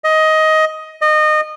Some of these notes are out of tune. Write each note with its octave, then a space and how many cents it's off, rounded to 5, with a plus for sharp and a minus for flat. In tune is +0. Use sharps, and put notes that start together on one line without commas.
D#5 +15
D#5 -25